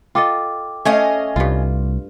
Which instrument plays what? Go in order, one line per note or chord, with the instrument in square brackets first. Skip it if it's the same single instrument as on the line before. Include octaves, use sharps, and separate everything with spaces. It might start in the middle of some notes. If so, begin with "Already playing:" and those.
[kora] F4 A4 D#5 [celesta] G5 D6
[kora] A3 [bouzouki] C#4 D#5 F5
[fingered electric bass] C2 [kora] G2 F4